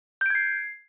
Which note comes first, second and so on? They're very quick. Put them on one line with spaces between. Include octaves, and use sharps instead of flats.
G6 D7 G#6 C7